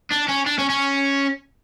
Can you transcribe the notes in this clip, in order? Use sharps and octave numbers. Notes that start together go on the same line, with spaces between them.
D4
C#4
D4
C#4
C#4